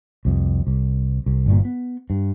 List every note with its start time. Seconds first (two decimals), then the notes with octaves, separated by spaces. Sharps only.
0.25 C2 F2
0.67 C2
1.26 C2
1.46 G1 G2 A#2
1.65 B3
2.10 G2